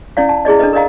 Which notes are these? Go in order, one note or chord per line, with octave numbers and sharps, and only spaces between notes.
C#4 E4 D5 F5
A5
E4 G#4 D5 D#5
D4 A4 B4 D#5
A#4 D5 D#5 F5 A#5